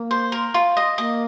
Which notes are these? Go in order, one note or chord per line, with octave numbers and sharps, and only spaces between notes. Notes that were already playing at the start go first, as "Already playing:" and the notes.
Already playing: A#3
C5
A#4
F4
D#5
A#3 D#5